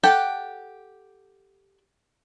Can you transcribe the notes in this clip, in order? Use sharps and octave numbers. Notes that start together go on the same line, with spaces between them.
G4 A4 F#5 G5 A5